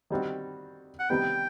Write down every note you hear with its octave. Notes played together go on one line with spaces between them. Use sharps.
D#3 G3 C4 D#4 F#4
F#5
C3 D#3 G3 B3 G5